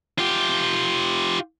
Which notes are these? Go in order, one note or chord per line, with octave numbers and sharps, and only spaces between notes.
F4 G4